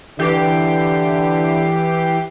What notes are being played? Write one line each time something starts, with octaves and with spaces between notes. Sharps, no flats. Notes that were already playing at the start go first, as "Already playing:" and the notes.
D3 E3 G4 C7